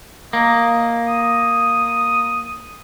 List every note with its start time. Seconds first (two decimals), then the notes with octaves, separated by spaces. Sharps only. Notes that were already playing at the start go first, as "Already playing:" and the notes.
0.33 A#3 D#5
1.08 D#6